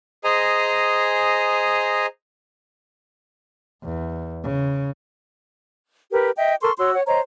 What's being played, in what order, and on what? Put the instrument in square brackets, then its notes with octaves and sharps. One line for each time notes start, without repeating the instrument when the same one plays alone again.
[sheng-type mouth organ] G#4 C5 D#5 G#5 A#5
[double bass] E2
C#3
[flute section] G4 A#4 B4
D#5 E5 G5
A4 A#4 C6 C#6
F#4 C#5 C6 E6
C#5 F#5
C5 C#5 D#5 A#5